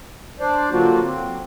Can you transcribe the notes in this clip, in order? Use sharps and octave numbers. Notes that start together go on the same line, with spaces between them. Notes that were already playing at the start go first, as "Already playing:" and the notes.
D4 C5 D5
D3 F#3 A#3 D4 F4 F#4
C4